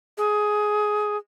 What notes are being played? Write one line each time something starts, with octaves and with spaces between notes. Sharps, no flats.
G#4